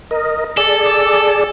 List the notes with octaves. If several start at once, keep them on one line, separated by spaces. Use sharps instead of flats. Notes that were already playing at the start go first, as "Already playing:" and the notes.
A#4 D#5
G#4 A4 D5